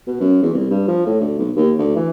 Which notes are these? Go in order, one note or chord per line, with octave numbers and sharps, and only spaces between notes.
B2
F#2
E2
C2
G2
F3
A2
D2
B1
D#2
D2
E3